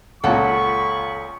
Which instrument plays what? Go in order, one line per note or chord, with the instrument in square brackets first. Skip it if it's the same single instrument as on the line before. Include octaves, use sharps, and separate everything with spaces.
[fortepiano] C#2 A#2 [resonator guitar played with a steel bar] A4 F#5 [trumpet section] B5 C#6